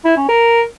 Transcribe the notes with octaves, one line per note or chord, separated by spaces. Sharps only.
E4
C#4
A#4